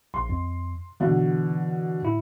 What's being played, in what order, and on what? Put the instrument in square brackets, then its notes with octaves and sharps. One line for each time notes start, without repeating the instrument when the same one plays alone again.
[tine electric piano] A#1 [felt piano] C6
[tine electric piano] F2
[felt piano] B2 D3 [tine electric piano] E3
[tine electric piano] A2 E4